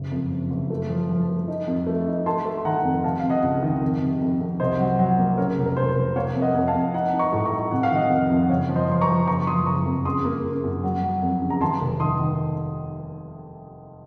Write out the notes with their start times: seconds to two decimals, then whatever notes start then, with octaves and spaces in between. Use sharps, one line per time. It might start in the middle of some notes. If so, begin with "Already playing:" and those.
Already playing: F#1
0.12 F2
0.31 F#1
0.50 F#1
0.70 A3
0.89 F3
1.09 F3
1.29 A3
1.48 D#4
1.67 F2
1.87 A3
2.07 D#4
2.26 A3 A5 C6
2.45 A3
2.57 C6
2.65 D#3 F#5 A#5
2.84 F2
3.04 C3 F5 A5
3.19 C3 F5
3.30 D#5 F#5
3.43 C#2
3.63 D#3
3.82 F2
4.01 C3
4.21 F2
4.40 F2
4.60 C2 C5 D#5
4.79 F#3
4.99 F#3
5.19 A#3
5.38 C#3 A#4 C#5
5.58 F1
5.66 A#4
5.77 F1 C5
5.96 F1
6.16 A#3 C#5 F5
6.35 F2
6.42 D#5 F#5
6.55 F2
6.68 F5 A5
6.75 F2
6.94 D#4 F#5 A#5
7.13 D#4
7.19 A#5 C#6
7.33 A2
7.45 A#5 C#6
7.52 D#4
7.71 C3 F#5
7.83 F5
7.91 D#3 D#5 F#5
8.11 F2
8.30 F2
8.41 F#5
8.49 F#1 C#5 F5
8.69 F3
8.76 C5 D#5
8.88 F3 C6
9.01 A#5 C#6
9.08 F3
9.27 F#1 A#5 C#6
9.47 F3 C6 D#6
9.66 F#1 A#5 C#6
9.86 F2
10.05 C#3 C6 D#6
10.25 A#3
10.45 C#3
10.64 F#2
10.83 F#3
11.03 F#3
11.22 F2
11.42 C#3
11.50 A#5
11.61 D#2 A5 C6
11.81 F1
12.00 D#3 C6 D#6
12.20 D#3